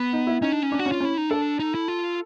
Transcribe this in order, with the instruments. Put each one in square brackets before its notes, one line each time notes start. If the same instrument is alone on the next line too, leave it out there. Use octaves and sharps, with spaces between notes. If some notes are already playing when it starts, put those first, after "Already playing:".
Already playing: [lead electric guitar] B3
[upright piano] D#4
E4
[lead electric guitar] C#4 [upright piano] D#4
[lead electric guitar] D4
C#4
[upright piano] D4
[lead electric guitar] F#4
[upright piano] C#4
[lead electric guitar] F4
[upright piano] C#4 [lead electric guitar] E4
[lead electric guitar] D#4
[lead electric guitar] D4 [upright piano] A4
[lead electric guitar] D#4
E4
F4